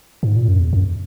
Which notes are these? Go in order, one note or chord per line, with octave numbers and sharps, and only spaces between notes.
G#2
A#2
F#2
E2
F#2